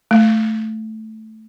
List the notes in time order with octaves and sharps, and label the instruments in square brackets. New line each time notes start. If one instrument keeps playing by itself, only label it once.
[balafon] A3